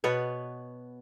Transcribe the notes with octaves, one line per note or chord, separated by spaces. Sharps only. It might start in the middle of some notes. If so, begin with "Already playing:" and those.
B2 B3 B4 C#5